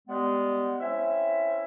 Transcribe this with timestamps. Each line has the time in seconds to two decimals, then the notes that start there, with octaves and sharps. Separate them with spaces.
0.08 G3 G#3 B3
0.80 C4 C#4 E4 E5